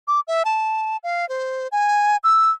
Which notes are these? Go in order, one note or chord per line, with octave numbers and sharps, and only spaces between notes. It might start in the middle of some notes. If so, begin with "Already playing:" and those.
D6
E5
A5
F5
C5
G#5
E6